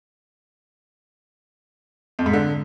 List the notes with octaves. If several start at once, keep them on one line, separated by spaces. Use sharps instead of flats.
F2
G#2
D3